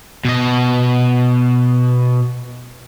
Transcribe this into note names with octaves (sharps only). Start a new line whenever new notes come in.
B2 D#5